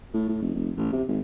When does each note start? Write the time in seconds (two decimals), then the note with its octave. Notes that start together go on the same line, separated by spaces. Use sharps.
0.14 A2
0.29 A2
0.42 F1
0.55 F1
0.77 A1
0.93 C3
1.08 G#1